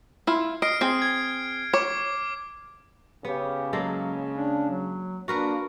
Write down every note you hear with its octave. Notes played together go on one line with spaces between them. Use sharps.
E4 F4
D#5 F6 C7 D7
C4 G#4
G#6
C#5 D6
C#3 B3 G4
F#3 G#3 A#3 A4
D4
F#3
A#3 D4 F#4 A#4 B4